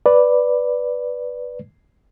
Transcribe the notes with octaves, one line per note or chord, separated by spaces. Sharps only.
B4 D5